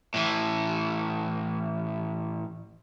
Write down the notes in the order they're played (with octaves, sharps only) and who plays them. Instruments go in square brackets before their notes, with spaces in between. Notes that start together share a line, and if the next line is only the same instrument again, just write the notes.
[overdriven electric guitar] A2 E3